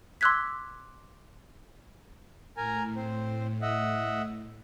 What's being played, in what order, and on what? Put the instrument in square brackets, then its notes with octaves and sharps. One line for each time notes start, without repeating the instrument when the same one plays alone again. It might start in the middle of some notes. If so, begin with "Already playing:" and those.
[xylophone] C6 D6 E6 F#6 G#6 B6
[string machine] A2 [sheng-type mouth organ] A#4 G#5 A#5
[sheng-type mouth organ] C4 C5
D#5 E5 F#5